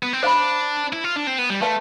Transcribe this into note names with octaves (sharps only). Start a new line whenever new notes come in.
B3
C4
D4 C5 F5 B5
E4
F4
D4
C4
B3
G3
A3 B4 F5 A5 C6